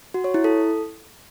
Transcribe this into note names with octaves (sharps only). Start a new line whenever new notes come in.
F#4
C#5
E4
A4